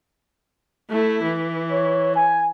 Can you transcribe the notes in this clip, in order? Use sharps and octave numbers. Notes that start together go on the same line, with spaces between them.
A3 E4
E3
C#5
G#5